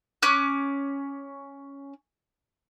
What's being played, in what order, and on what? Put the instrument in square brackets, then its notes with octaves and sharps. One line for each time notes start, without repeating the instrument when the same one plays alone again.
[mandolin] C#4 D6 F#6